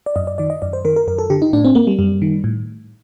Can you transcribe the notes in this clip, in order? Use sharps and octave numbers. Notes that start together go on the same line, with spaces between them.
D5
F#2 D#5
D5
D#3 D5
D#5
F#2 D5
C5
D#3 A#4
A#4
F#2 A#4
A4
D3 G4
D#4
A2 D4
C4
A#3
G3
F#2 G3
D#3
A2